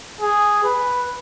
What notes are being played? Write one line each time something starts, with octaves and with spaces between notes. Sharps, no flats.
G#4
B4